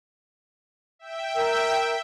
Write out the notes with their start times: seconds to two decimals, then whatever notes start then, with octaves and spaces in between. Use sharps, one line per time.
0.99 E5 G5
1.35 A#4